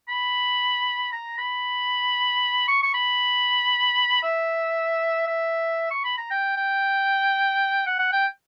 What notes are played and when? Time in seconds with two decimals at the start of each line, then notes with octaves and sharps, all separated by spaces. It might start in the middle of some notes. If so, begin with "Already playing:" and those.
0.08 B5
1.12 A#5
1.38 B5
2.67 C#6
2.82 C#6
2.94 B5
4.23 E5
5.27 E5
5.91 C#6
6.04 B5
6.17 A#5
6.30 G5
6.56 G5
7.86 F#5
7.99 F#5
8.12 G5